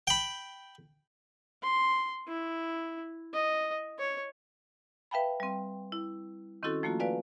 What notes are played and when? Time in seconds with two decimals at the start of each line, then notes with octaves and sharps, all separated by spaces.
0.07 G5 B5
1.63 C6
2.28 E4
3.34 D#5
3.99 C#5
5.11 B4 E5 F5 G5 A5 B5
5.40 G3 C4
5.92 E4
6.63 D#3 C4 C#4 E4 F#4 A4
6.83 F3 A3 A#3 F4 F#4
7.00 F#4 B4 D5 F5 G#5